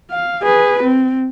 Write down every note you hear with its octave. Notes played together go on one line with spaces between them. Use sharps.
F5
G#4 B4
C4